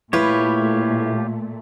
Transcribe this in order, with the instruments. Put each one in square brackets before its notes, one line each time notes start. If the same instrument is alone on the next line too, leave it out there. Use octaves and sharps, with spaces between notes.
[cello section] A#2 A3 [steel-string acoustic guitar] E4 B4 [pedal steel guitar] F4 G4 C#5